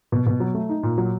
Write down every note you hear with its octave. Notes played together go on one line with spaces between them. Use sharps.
B2
B2
F#3
A3
D#4
A#2
F#3